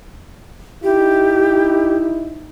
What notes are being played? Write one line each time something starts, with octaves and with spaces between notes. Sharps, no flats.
D#4 E4 G4